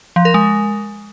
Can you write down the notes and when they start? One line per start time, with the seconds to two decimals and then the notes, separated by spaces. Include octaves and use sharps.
0.16 F3
0.25 A#4
0.34 G#3